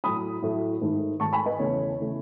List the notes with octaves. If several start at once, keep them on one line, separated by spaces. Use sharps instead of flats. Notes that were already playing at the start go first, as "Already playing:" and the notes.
A2 F#3 A3 B5 D#6
A2 F#3 A3
G#2 D#3 A3
G#2 D#3 A3 A5 C#6
G#5 B5
B4 D#5
E2 C#3 E3 A3 C#5
C#3 E3 A3